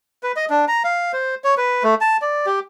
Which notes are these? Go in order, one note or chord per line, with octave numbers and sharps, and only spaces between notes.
B4
D#5
D4
A#5
F5
C5
C#5
B4
A3
A5
D5
G4